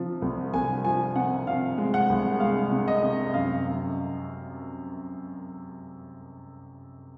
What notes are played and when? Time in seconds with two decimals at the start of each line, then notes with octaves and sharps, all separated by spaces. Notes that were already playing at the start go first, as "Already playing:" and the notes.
Already playing: C3 F3
0.22 C2
0.54 C2 G#5
0.85 F3 G#5
1.15 C3 F#5
1.46 C3 F5
1.78 G#3
1.94 F#5
2.09 C2
2.40 G#3 F5
2.71 C3
2.88 D#5
3.03 C3
3.34 F#2 F5
3.65 F#2